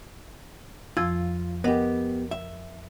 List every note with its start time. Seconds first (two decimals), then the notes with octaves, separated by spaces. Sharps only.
0.97 F2 F3 F4 E6
1.64 B3 G4 A#4 D#5 F#5
2.31 E5